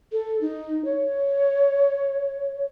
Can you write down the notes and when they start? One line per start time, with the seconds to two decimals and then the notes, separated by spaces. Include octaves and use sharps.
0.12 A4
0.41 D#4
0.85 C#5